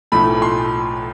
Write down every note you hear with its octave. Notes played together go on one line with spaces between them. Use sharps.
B1 A2 F3 A3 B5
C6